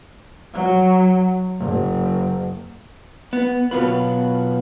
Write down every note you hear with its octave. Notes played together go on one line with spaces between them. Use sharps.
F#3
F#1
B3
B2 F#3 B3 F4 B4